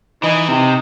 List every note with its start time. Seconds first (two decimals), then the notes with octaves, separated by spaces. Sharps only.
0.23 E3 D#4
0.48 C3